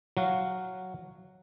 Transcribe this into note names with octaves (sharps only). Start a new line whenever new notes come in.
F#3 F#4 F5